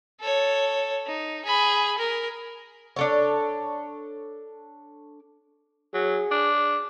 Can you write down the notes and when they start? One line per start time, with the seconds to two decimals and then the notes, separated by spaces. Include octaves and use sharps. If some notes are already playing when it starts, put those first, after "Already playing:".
0.20 A4 C#5
1.06 D#4
1.45 G#4 B5
1.98 A#4
2.96 D4 A4 C#5
5.94 F#3 G#4
6.31 D4